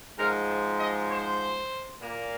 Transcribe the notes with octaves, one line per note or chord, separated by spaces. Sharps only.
G#2 F3 G#3 A#4
C5
D#5
C5
A#2 A#3